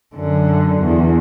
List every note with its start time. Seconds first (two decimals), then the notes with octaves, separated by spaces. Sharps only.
0.15 F#2 D3
0.81 E2